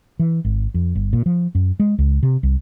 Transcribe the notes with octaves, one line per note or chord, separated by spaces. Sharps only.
E3
G#1
F2
G1
A#2
F3
F#2
G#3
C#2
C3
C2